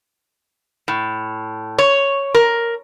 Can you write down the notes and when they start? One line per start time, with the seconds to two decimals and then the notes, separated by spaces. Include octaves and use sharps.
0.88 A2
1.78 C#5
2.34 A#4